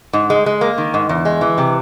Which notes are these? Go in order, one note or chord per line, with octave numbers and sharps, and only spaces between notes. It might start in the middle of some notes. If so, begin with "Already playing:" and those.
G#2
G#3
G#3
A#3
D#3
G#2
E2
G#3
E3
C3